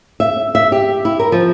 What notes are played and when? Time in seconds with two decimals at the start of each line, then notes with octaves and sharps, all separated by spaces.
0.20 E5
0.55 E5
0.72 G4
1.05 E4
1.19 A#4
1.32 F3